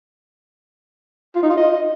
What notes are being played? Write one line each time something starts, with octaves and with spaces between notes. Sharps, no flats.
F4
D#4
F4
D#5